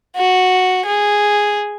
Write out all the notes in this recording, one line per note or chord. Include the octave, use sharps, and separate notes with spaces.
F#4
G#4